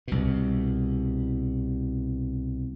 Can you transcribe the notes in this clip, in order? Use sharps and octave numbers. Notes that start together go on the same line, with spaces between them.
C2 B2